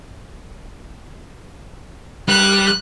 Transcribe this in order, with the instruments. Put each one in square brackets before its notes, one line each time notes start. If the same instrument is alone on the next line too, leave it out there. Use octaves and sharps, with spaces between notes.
[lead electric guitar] G3 [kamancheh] F#6